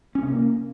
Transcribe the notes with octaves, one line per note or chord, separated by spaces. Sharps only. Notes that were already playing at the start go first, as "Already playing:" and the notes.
C#4
C3
A#3